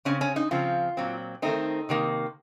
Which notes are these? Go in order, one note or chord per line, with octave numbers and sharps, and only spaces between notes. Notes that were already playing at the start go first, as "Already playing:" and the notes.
C#3 F#3 C4 C#4
C#4
D#4
C#3 F3 C4 F4
A#2 F#3 C4
D#3 A3 C4 D#4
C3 D#3 A#3